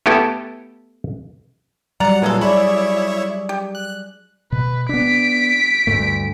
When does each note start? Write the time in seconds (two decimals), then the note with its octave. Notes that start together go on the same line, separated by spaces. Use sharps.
0.06 A3 B3 E4 G4 A4
2.00 F#3 G3 D5 F#5 A#5 C#7
2.22 A#2 E3 G#3 F4 A4
2.41 E4 G#4 C#5 D5 E5 B5
3.49 G4
3.75 F#6
4.52 B2 B4
4.89 B3 D4 B6 D7
5.87 D2 G2 A3